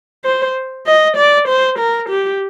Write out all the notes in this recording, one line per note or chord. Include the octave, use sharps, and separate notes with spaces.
C5
D#5
D5
C5
A#4
G4